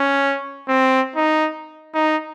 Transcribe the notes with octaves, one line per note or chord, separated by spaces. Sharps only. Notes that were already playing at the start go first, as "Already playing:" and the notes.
Already playing: C#4
C4
D#4
D#4